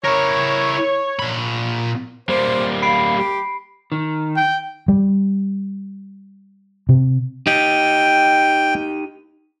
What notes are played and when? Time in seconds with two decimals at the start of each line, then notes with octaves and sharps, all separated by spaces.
0.04 E4 A#4 C#5
1.19 A#2 B5
2.29 G3 A#3 C5
2.82 F5 B5 C7 D7
3.18 G4
3.92 D#3
4.36 G5
4.88 G3
6.89 C3
7.47 D#4 G4 G5